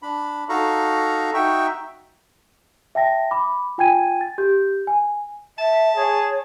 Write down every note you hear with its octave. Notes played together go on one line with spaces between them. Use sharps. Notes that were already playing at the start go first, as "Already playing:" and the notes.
D4 B5
D#4 F#4 A4 F5 A#5 C#6
D#4 F#4 E5 G5 C#6
E5 G5 A5 A#6
B5 D6
F4 G5 G#5 G#6 D#7
A6
G4 G6
G#5
E5 A5
G#4 C#5